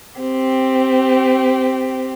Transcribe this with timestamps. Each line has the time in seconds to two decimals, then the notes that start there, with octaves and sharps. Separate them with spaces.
0.20 C4 G4